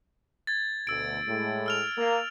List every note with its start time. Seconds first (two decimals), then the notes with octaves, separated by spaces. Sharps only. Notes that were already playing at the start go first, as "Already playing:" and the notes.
0.47 G#6 A6
0.87 D2 B2 E6 D7
1.26 A2 G#3
1.66 E6 F6 F7
1.98 A#3